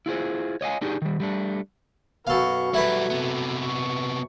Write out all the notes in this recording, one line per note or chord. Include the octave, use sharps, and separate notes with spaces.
E4 F4 G#4 C5
C#5 D#5 F5 G#5
D4 D#4 G4 G#4
D#3 G3
G3 A3 D4
F#2 B2 B3 A4 F5 C#6
G3 A3 E4 F#4 B4
C3 B3
C#6